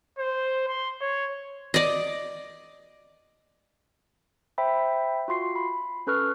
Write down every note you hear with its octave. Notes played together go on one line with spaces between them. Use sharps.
C5
C6
C#5
D5 D#5
C5 E5 G5 B5
F4 F#4 C6 C7
B5
C#4 A4 B4 C#6 F6